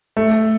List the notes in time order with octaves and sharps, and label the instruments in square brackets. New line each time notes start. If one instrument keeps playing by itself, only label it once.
[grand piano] A3